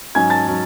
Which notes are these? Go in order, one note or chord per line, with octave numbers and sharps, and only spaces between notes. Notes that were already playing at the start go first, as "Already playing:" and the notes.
G#2 F#3 C#4 G#5 G#6
A5 A6
F#3 C#4